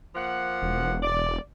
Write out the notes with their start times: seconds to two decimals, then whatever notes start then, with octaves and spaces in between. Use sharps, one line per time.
0.15 F3 A#3 F#5
0.62 E1
1.02 D5